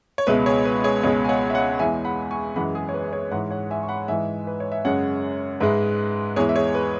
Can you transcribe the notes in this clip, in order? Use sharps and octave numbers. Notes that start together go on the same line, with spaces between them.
C#5
C#2 B2 G#3 B4 E5
G#4 C#5
B4
G#4 C#5
C#2 B2 G#3 G#4 C#5
G#5
C#5 F#5
E5
C#5 F#5
E2 E3 G#3 E5 G#5
F#5 B5
G#5 C#6
F#2 E3 G#3 F#5 B5
G#4
C#5
B4
G#4 C#5
G#2 E3 G#3 C#5 F#5
C#5 F#5
E5 G#5
C#6
F#5 B5
G#2 E3 G#3 E5 G#5
B4
C#5
E5
F#2 C#3 G#3 C#5 F#5
G#2 G#3 B4 E5
E2 E3 G#3 G#4 C#5
E5
G#4 C#5
B4